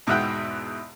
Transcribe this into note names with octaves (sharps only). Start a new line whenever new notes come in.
E2 G#2 B2 E5 F#5 G5